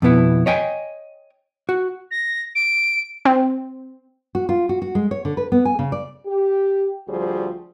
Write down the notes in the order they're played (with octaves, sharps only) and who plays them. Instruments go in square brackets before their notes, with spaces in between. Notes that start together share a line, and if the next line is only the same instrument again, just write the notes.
[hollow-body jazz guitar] F2 B2 B3 E4
C#5 D#5 G5 G#5
F#4
[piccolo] A#6
D7
[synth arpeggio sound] C4
[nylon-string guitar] F#4
F4
F#4
F#4
G#3
C#5
D3
B4
B3
G#5
C#3
D5
[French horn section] G4
D2 F3 G3 F#4 G#4 C5